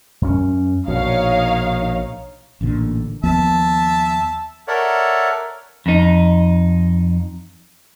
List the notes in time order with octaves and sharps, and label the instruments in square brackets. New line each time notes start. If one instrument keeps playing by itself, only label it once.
[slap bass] F#2 C#4
[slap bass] A#1 B2 [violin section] D#4 C#5 F5
[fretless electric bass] A1 A#2 D3
[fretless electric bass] D#2 F3 B3 [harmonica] E5 A5
[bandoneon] A4 A#4 C#5 D5 E5 F#5
[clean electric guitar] F2 D#4